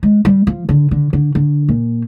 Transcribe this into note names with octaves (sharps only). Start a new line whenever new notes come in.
G#3
G3
F3
D3
D3
D3
D3
A#2